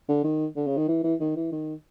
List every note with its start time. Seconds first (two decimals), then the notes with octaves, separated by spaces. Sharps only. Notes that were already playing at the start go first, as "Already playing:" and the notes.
0.08 D3
0.24 D#3
0.56 D3
0.67 C#3
0.77 D#3
0.88 E3
1.04 E3
1.20 D#3
1.36 E3
1.52 D#3